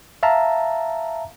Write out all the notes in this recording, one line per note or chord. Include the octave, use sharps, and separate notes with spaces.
E5 F5 A5 A#5